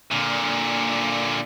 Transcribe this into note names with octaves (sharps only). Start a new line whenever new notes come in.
A#2 D3